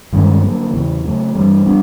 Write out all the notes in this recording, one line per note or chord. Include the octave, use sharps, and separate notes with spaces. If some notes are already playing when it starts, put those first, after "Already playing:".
G2 D#3 G#3 C#4
D3 F#3 A#3
E2 C#3 E3
C#3 F#3 A3
G2 E3 G3
G3 B3 D4